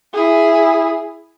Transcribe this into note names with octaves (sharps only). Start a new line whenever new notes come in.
E4 G#4